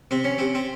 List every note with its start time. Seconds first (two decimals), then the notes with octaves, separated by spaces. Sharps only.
0.11 C3 C4
0.24 C#4
0.38 C3 C4
0.55 C4